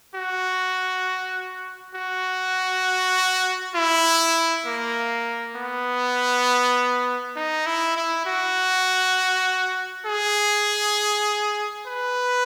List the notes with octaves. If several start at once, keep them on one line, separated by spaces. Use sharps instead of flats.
F#4
F#4
E4
A#3
B3
D#4
E4
E4
F#4
G#4
B4